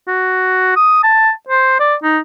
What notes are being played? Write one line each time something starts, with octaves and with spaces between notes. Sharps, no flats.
F#4
D#6
A5
C5
D5
D#4